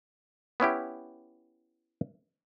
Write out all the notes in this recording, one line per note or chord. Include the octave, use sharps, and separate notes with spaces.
B3 C#4 E4 G4